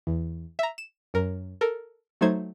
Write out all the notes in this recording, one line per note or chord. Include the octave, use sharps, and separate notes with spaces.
E2
E5 A#5
E7
F#2 A#4
A4 A#4
F#3 A3 D#4 C5 G#6